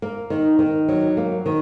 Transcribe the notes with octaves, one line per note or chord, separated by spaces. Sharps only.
A#3
D#3
D#3
F#3
A#3
D#3